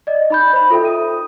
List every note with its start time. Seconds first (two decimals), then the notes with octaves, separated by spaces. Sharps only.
0.07 D5 D#5
0.30 D#4 B5 G6
0.53 C5 B5
0.70 F4 A4 E5 G5
0.85 D#6 D#7